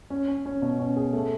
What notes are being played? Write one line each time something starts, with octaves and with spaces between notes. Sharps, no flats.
C#4
C#4
C#4
B2
C#4
G#4
A3